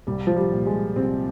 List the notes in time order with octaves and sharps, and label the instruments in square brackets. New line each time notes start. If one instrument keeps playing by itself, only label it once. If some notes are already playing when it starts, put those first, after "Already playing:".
[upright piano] C2 G3
F3
G3
A#2
G#3
C2 C4